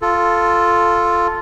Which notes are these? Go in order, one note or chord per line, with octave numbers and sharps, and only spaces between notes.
F4 A4